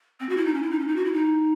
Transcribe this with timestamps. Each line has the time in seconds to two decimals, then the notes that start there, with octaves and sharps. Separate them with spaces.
0.20 C4
0.29 F#4
0.37 E4
0.46 D#4
0.54 C#4
0.62 E4
0.71 D#4
0.79 C#4
0.87 D#4
0.96 F#4
1.05 E4
1.13 D#4